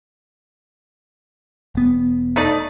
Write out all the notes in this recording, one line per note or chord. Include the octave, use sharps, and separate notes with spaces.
E1 B3
A3 D#4 D5